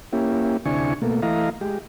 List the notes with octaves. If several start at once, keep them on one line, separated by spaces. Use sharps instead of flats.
A#3 C#4 E4 G4
D2 C3 D4 E4 G#5 C#6
B2 A3 A#3
E3 A3 E4 D#5 F5 A#5
G#3 G4